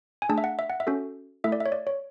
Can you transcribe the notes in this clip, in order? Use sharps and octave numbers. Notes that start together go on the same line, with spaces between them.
G#5
A3 D4 G#4 A5
E5
F#5
E5
F#5
E5
C#4 F#4 A4
A3 E4 A4 E5
D5
E5
C#5
D5
C#5